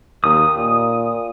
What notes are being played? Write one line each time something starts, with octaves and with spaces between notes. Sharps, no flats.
D#2 D#6
A#2